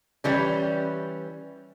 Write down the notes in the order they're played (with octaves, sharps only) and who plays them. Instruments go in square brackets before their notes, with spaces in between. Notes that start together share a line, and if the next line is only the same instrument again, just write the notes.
[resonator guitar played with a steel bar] E3 G3 C#4